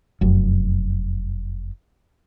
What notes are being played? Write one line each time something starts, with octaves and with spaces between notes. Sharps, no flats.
F1 F#2